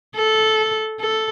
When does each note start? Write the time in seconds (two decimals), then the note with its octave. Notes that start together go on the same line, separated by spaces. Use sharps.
0.16 A4
1.00 A4